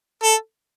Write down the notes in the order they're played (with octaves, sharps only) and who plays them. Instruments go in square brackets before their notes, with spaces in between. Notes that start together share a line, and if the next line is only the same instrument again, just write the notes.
[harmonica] A4